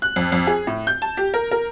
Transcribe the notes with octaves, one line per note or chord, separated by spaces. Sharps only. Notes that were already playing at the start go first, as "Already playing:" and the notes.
F#6
F2
F2
G#4
A2
G6
A5
G4
A#4
A#4